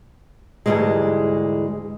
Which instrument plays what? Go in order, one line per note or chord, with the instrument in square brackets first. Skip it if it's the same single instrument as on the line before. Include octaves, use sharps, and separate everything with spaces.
[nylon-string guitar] D2 G#2 B2 E3 G3 G#3